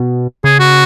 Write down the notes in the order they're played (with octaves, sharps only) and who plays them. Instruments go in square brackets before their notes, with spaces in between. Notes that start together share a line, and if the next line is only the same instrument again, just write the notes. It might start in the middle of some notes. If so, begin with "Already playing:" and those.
Already playing: [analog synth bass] B2
[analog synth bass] C#3 [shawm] G#4
[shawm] F#4